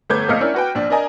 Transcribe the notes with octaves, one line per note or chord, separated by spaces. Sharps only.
G1 A3 B4 D6 G6 G#6
A#1 A3 D#5 F5 F6 C#7
C#4 D4 E4 A#4
F#4 B4 G5
A#1 D4
D4 A#4 D#5 G#5 A#5